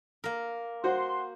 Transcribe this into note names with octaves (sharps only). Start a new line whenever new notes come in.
A#3 A#4
F#4 C5 F#5 C6